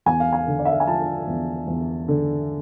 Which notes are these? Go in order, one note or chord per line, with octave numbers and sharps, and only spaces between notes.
E2 G#5
F5
G#5
D3
D5
E5
F5
G#5
F3 A5
E2
E2
D3